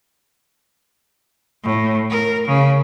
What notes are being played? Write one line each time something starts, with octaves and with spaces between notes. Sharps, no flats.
A2
A#4
C#3